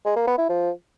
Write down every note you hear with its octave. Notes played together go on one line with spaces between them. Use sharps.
G#3
A#3
B3
E4
F3